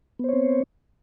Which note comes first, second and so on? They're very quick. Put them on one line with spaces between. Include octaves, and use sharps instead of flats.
B3 C5 C#5 C4